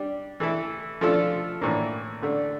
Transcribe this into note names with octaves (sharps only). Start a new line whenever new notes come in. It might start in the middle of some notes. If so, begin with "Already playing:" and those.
Already playing: G3 D4 G4
E3 A3 E4 A4
F3 A3 D4 F4 A4
A2 E3 A#3 D4
D3 A3 D4